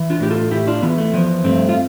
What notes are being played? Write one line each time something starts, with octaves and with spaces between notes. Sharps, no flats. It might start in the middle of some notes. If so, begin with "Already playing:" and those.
Already playing: E3
D4 F4
A2 G4
F4 A4
A2 E4 G4
D4 F4
E3 B3
A3
F3 B3
G2 A3 C4
F4